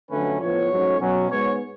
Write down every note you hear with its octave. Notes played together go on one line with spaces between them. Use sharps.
F2 D3 F#3 A3 C#4 B4
A2 F3 B3 C#5
G#2 F#3 A3 C#4
B2 F#3 C#4
G#2 G#3 B3 C#5